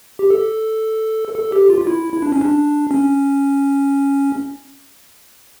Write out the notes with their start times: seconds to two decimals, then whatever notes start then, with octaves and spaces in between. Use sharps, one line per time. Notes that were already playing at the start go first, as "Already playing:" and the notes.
0.19 G4
0.30 A4
1.35 A4
1.52 G4
1.70 F4
1.81 F4
1.87 E4
2.13 E4
2.22 D4
2.32 C#4
2.41 D4
2.91 C#4